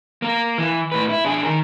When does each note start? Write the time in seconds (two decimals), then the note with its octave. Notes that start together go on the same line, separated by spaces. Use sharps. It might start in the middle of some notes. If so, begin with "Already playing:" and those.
0.22 A#3 A#4
0.58 E3
0.92 A2 B4
1.09 E4
1.25 D4 G#4
1.44 D#3 A#4